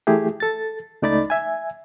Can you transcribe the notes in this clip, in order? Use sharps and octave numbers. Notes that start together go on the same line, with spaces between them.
E3 A3 E4 G4 G#4
A4 A6
C#2 A3 D#4 D5 B5 A6
E5 G#5